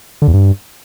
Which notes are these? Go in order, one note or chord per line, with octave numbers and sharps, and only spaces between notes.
D3
E2
G2